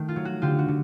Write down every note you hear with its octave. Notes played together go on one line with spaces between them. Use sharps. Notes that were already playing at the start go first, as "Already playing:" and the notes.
Already playing: D#3 A3 A4
F4
F#3
F#4
D3 F4 G4
F#4
D3